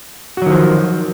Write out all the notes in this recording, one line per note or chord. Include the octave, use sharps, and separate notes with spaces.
D#3 F3 F#3 F#4